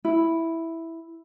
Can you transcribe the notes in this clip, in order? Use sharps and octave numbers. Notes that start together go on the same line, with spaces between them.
E4